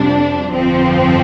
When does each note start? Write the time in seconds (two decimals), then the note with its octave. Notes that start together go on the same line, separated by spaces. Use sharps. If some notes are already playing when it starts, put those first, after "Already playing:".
Already playing: F2 C3 G3 D4
0.52 G1 F2 F3 C4